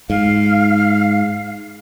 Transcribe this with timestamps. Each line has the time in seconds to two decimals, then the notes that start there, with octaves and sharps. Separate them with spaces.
0.10 G#2 F5